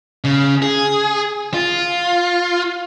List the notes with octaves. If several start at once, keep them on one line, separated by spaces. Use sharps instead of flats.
C#3
G#4
F4